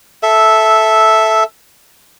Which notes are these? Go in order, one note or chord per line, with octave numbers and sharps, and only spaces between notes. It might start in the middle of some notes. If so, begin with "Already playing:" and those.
A4 E5